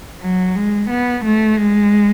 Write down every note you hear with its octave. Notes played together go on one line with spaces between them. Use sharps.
F#3
G#3
B3
A3
G#3